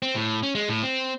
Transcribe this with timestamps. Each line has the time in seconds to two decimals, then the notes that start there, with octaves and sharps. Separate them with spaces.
0.02 C4
0.15 A2
0.43 C#4
0.55 G#3
0.69 A2
0.83 C4